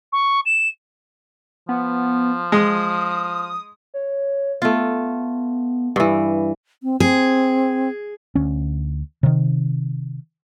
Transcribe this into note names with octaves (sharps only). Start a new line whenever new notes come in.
C#6
E7
F3 B3
G#3 D#6
C#5
A3 B3 F4
G2 E3
C4
C4 G#4
D2 C#4
C3 D#3